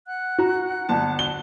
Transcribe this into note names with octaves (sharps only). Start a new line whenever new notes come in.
F#5 F#6
F#4 A#5
G1 A5
G7